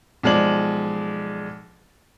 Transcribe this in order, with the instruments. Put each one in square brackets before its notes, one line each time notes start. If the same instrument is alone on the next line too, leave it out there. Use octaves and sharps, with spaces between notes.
[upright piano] B1 F3 G#3 D5 F#7